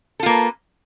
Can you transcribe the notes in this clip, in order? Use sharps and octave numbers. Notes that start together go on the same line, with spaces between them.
A#3 F4 A4 B4